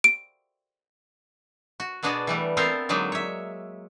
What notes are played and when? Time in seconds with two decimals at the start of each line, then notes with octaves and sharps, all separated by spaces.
0.04 D7
1.80 F#4
2.03 B2 B3 D4 F#4 G#4
2.27 E3 G3 A3
2.57 B3 C4 A4 A#4 C5 F5
2.89 D3 F#3 G#3 A#3 D#4
3.12 C#5 E5